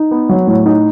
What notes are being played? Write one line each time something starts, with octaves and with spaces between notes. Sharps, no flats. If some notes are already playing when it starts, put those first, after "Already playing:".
Already playing: D#4
B3
F#3
A2
D#4